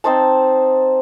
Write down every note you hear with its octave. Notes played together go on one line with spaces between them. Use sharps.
C4 D#4 C5 A5